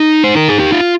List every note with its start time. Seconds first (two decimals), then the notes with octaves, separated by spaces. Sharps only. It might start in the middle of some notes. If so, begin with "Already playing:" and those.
Already playing: D#4
0.24 C5
0.36 A#4
0.49 G#4
0.60 G4
0.72 F4